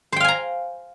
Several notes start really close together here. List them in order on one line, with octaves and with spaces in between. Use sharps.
C5 G5 F5 G#5 A#5